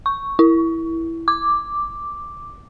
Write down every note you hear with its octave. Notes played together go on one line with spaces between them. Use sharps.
C#6
E4
D6